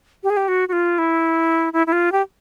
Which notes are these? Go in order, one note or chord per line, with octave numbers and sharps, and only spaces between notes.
G4
G#4
G4
F#4
F#4
F4
E4
E4
E4
F4
G4